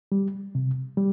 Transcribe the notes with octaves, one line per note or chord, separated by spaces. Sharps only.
G3
C3
G3